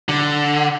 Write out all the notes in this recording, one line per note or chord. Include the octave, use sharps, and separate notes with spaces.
D3